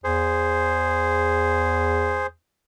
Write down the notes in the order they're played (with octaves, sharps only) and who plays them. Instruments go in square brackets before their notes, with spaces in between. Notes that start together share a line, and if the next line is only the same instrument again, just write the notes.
[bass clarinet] E2 [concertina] G#4 C5